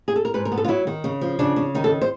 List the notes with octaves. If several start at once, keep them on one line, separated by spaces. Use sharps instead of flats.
G#4
A4
A#4
G#2 B4
A#4
B3
A4
F4
F#3 E4
D#3
C#3
F3
C#3 D4
C#3
D#3 D#4
A4
C5